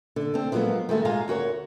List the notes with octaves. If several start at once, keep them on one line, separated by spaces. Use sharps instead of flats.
D3
C4 D4
F3 F#3 G#3 A#3 B3
D#3 G#3 A3 F#4
G#2 G#3 F4 F5 G#5 A#5
D2 F#4 A#4 C#5